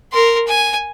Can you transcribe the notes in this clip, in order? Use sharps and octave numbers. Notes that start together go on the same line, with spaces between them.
A#4 C6
G#5